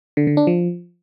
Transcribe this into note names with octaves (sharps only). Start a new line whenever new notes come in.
D3
D3
D4
F3